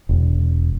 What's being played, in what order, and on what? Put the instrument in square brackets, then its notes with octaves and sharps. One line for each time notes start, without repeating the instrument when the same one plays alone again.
[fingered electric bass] E1